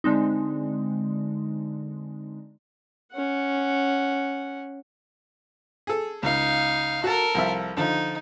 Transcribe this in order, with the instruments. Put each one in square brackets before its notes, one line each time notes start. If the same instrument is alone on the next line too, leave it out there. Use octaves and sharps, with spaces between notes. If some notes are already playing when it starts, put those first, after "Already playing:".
[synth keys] D3 G#3 C4 D#4
[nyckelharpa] C#4 F#5
[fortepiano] G#4 A4
[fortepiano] C#2 [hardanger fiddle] D#4 F5
[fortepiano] F#4 A5 [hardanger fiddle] A4 A#4
[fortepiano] C2 F3 E5
[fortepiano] D3 F3 [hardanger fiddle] D#4